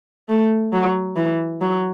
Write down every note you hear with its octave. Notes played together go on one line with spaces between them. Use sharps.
A3
F#3
E3
F#3